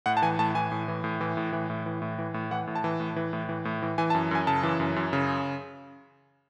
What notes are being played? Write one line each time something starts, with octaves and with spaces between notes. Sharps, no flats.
A2 F#5
A5
E3 G#5
A2 A5
E3 G#5
A2
E3
A2
E3
A2
E3
A2
E3
A2
E3
A2
E3 F#5
A2
A5
E3
A2
E3
A2
E3
A2
E3
E3 G#5
A5
F#2
F#2 G#5
C#3 A5
E3
F#2
F#2
C#3